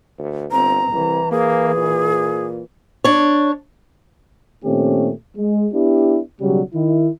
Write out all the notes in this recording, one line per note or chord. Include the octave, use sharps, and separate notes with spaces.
D2
G1 C4 A#5
C2 E3
A#3 G#4
A#2
D4 C#5
A#2 D#3 A3 C4 C#4 G4
G#3
B3 D4 E4 G4
B1 C#3 F#3 G3
D#3 E4